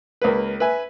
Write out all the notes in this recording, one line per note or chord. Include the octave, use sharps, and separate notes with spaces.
C#2 A#3 B4
B4 E5 G#5